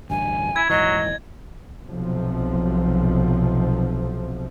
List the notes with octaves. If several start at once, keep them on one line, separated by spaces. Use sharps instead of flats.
A1 D2 G2 G#5
E4 G#6
D#1 G#2 E3 F#3 D#5
B1 C3 F3